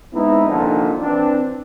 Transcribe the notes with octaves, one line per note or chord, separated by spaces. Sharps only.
G#3 B3 C4 D#4 E4
C2 F2 A#2 D3 D#3 C4
E3 C4 D4